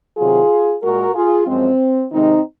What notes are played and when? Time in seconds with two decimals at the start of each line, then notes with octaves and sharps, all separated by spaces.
0.17 C3 D#3 F#3 F4 G#4
0.82 A#2 G#3 F#4 A#4
1.14 F4 G#4
1.46 F#2 F3 G#3 C4
2.11 C3 D#3 G#3 C4 D#4